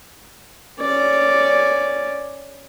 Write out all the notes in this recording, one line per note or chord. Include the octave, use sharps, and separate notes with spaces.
C#4 D5